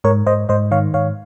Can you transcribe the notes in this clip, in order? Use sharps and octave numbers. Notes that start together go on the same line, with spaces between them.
G#2 A#4 C#5
G#2 C5 D#5
G#2 C5 D#5
D#3 C#5 F5
G#2 C#5 F5